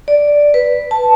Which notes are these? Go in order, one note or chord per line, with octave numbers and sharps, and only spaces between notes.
D5
B4
A5